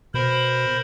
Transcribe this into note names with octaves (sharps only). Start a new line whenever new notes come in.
B2 A#4 C5 B5